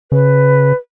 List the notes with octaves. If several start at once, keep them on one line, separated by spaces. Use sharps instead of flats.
C#3 B4